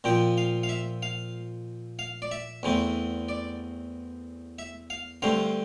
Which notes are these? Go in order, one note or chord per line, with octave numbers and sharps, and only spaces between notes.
A#2 F3 C4 G5
F5
F5
E5
F5
F5
D5
E5
E2 E3 A3 C4
D5
E5
F5
G2 D3 A3 C4 F5